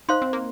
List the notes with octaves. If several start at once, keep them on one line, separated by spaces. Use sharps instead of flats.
D#4 C5 F5 C6
C4
A#3